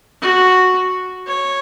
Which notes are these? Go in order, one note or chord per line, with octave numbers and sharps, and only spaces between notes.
F#4
C#5